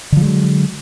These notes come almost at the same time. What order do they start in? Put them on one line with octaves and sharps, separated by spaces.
D3 F3 G#3 F#3